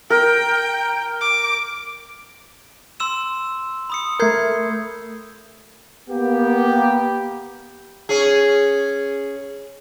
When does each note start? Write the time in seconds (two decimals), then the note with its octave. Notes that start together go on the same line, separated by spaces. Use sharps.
0.10 A#4 G5
1.21 D6
3.00 C6 E6 E7
3.90 B5 D#6 C#7
4.20 A3 A#4 G6 G#6 C7
6.09 A#3 B3 G4
8.09 C#4 G#4